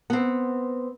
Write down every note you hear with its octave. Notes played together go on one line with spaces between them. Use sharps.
B3 C4